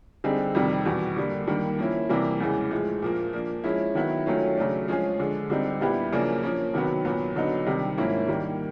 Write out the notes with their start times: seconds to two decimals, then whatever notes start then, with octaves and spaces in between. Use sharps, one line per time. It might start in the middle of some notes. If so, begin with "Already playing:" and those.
0.24 D3 G3 C4 D#4 G#4
0.55 F2 C3 D#3 G3
0.85 E2 B2 G3
1.16 D3 G3 A#3
1.48 G2 D#3 G3 A#3
1.79 F3 A#3 C#4 E4
2.09 C3 E3 G3 A#3
2.40 E2 C#3 E3 G#3
2.71 A2 F3 G#3
3.02 A#2 F3 A#3
3.33 F3 A#3 D4
3.64 F3 G#3 C#4 E4
3.95 D#3 F#3 B3 E4
4.26 D#3 F#3 A3 C#4 F4
4.57 C#3 F#3 A3 D4
4.88 F3 G#3 C#4 F4 G#4
5.19 D3 F3 G#3
5.50 D3 G3 C4 D#4
5.81 A#2 G3 B3 E4 G4
6.12 F#2 C#3 F3 A#3 D4
6.43 F3 A#3 C#4
6.74 C3 D#3 F#3 B3
7.05 A#2 F#3 B3
7.36 D3 F#3 B3 D#4
7.66 C3 D#3 G3
7.98 G#2 F3 A#3 C#4 E4
8.28 D#3 G3 A#3